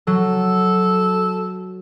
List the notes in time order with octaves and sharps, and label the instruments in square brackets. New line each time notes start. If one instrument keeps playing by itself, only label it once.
[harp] F#3 [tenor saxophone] A4